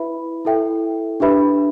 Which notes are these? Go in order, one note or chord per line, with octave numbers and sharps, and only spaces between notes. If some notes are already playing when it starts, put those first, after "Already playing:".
Already playing: E4 B4 E5 B5
E4 A4 E5 G5
D4 G4 B4 E5 B5